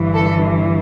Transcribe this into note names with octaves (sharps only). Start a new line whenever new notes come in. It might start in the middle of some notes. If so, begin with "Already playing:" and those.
Already playing: G1 G2 E3
A4